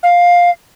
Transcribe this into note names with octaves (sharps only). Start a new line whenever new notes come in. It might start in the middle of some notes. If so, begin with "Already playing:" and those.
F5